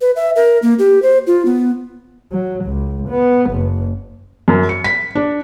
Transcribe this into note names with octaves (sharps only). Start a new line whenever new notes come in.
B4
E5
A#4
A#3
G4
C5
F4
B3
F#3
C#2
B3
F#1
F#2
C#7
B6
D4